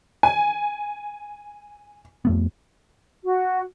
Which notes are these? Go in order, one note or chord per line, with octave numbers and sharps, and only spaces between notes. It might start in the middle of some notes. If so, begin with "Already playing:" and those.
G#5
F2 A3 B3
F#4